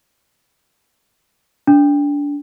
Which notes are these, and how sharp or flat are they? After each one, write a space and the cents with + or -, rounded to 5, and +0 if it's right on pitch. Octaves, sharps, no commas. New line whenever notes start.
D4 -25